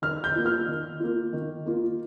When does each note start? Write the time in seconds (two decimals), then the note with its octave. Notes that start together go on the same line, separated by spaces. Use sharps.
0.02 D#3 F6
0.24 G6
0.35 A#3 F4
0.46 F6
0.67 D#3
1.00 A#3 F4
1.33 D#3
1.66 A#3 F4